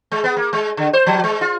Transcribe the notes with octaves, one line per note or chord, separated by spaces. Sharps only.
G#3
B3
A#3
G#3
D3
C5
F3
G#3
F4